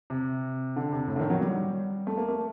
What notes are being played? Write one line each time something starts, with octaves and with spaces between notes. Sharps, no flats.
C3
D3
C3
A2
D3
D#3
F#3
G3
A3
A#3
A3